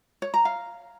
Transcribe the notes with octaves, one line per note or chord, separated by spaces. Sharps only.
C#5
A#5
F5